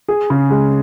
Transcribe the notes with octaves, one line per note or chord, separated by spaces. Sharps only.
G#4
C#3
G#3